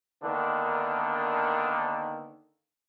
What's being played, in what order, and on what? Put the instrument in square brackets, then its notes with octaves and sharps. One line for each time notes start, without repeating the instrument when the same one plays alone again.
[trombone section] D3 D#3 A#3 B3 D4